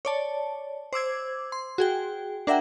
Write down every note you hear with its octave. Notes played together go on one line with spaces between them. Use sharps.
C#5 D5 A5
C5 D6 E6 G#6
C6
F#4 G#4 G5
D4 A#4 E5 F#5 G5